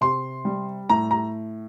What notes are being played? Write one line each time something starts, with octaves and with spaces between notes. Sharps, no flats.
C3 C6
G3
A2 A#5
A#5